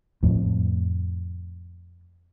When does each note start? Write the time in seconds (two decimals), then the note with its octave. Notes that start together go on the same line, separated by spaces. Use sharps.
0.23 F2 A2